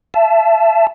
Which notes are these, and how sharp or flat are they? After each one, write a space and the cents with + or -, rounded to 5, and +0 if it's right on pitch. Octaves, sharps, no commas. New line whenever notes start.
E5 +30 A5 -10